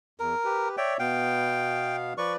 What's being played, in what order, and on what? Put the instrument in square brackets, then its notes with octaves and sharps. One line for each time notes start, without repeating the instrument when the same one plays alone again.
[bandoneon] E2 [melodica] A#4
[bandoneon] G4 B4
[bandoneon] C#5 D5 E5 [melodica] G5
[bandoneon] B2 B3 F5 [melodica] G5
[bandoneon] F3 B4 D5 [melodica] C#6